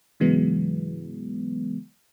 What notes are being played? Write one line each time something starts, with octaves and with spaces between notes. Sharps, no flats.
G#2 C#3 E3 F#3 G#3 B3